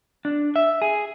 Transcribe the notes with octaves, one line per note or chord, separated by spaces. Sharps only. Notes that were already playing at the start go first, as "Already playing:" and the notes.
D4
E5
G#4